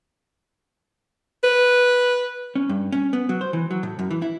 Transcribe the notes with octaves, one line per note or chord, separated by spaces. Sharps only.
B4
C#4
G2
C#4
B3
F#3
C5
E3
F#3
A2
F#2
E3
E4